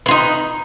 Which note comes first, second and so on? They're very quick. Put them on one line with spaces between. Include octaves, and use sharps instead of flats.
B4 F4 D#4